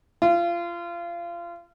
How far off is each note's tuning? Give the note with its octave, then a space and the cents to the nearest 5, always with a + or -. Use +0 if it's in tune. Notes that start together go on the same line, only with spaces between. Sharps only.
F4 -25